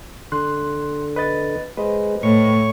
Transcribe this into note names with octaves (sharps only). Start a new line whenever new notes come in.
D3 C6 F#6
B4 D#5 A6
G#3 B4 C5 D#5
A2 C#5 C#6